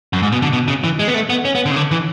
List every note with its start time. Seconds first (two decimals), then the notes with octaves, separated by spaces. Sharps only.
0.13 F#2
0.22 G#2
0.32 B2
0.42 D3
0.53 B2
0.68 C#3
0.84 E3
0.99 G#3
1.08 B3
1.14 A3
1.30 B3
1.45 C#4
1.55 B3
1.66 D3
1.71 C#3
1.76 D3
1.91 E3